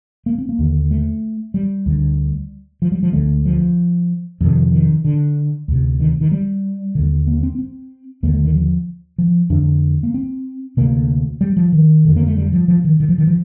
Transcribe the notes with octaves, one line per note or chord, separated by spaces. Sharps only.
A#3
C4
A#3
D#2 D3
A3
G3
D2 D3
F3
G3
F3
D2 D3 A3
F3
F2 C3 D#3
D#3
D3
D2 C3
D#3
D#3
G3
D#2 D3
A#3
C4
C4
D#2 D3 A#3
A3
D#3
F3
F3
F2 D3 D4
A#3
C4
D2 C3 A#3
G3
F3
D#3
F2 D3
A#3
A3
G3
F3
F3
D#3
D#3
F3
D#3
F3